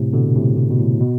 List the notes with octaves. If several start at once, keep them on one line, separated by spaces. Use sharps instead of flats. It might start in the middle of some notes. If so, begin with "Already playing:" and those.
Already playing: A2 C3
B2 D3
A2 C3
A2 C3
B2
A2
A2
B2